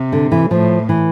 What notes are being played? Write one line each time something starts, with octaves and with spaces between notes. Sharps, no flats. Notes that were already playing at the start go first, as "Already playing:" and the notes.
Already playing: C3
D3
E3
A2 F3
E3